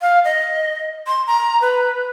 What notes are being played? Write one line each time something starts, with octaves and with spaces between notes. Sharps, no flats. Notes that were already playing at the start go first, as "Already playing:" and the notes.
F5
D#5
C6
A#5
B4